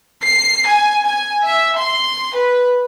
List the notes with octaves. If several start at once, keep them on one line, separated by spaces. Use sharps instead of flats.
C7
G#5
G#5
E5
C6
B4